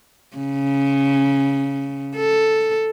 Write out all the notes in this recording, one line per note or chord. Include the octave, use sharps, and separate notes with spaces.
C#3
A4